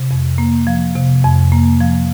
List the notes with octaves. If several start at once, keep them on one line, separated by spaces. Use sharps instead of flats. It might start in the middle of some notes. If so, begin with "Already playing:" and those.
Already playing: C3
F2
A#3
F3
C3
F2
A#3
F3